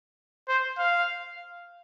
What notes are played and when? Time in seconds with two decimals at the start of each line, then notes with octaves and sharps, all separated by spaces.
0.48 C5
0.78 F5